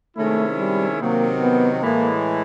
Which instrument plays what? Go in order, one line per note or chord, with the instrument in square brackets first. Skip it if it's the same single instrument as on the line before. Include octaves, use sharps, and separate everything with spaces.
[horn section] C3 D#3 G#3 C#4 E4 [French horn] A3
[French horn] G3
[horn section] C3 D#3 F#3 [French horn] A#3
[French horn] B3
[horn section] A2 E3 G#3 [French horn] A#3